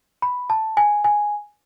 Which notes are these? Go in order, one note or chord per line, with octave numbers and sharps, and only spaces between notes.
B5
A5
G#5
G#5